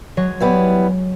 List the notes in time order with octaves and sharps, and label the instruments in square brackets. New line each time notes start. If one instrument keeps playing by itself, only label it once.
[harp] F#3 G#3 C#5
[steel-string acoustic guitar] E3 G3 B3